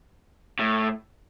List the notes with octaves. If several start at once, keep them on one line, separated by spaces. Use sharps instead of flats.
A2